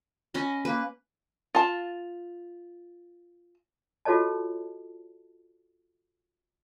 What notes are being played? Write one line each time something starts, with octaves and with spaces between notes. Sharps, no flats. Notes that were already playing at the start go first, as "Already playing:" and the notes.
C#4 D#5 B5
A#3 B4
F4 A5
F4 F#4 A4 C#5 D#5 A5